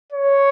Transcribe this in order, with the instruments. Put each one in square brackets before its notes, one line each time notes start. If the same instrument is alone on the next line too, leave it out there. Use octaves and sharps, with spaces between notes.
[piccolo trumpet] C#5